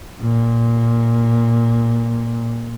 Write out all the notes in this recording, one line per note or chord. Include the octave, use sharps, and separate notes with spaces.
A#2